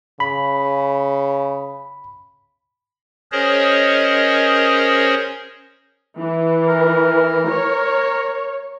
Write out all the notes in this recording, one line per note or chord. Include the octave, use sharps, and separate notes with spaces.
C#3 B5
C#4 G#4 A#4 C5 C#5 D#5
E3
A#4
C#5